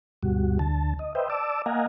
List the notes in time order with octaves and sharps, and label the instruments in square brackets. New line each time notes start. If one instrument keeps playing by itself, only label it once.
[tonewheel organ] D2 G2 B2 G3 F#4
D2 D3 A5
D#5
B4 C5 D#5 E5 G5
D5 A5 D6 E6
A#3 D#5 F5 F#5 G#5 A#5